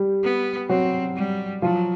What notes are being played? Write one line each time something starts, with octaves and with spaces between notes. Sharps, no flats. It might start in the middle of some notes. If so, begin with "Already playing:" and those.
Already playing: G3 G4
B3
F#3 C4 F#4
G3
F3 F#3 F4